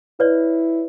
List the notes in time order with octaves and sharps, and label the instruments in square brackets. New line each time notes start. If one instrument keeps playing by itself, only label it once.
[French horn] E4 [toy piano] B4 C#5 D5